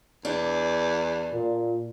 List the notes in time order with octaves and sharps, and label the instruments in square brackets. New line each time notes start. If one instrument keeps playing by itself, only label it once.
[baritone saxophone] E2 [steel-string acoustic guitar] D4
[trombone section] A#2